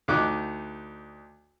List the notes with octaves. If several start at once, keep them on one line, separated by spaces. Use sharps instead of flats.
D2 D#4 F#5 D6